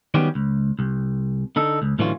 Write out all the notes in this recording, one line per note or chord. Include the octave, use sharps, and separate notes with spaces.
D#3 F#3 G3 B3 C#4 G4
C#2
C2
D3 D#4 A4
C#2
A2 D3 E3 F#3 C#4 F4